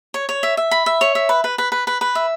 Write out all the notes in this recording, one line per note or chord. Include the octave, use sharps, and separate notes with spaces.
C#5
C#5
E5
E5
B5
E5
C#5
E5
B4
B4
B4
B4
B4
B4
E5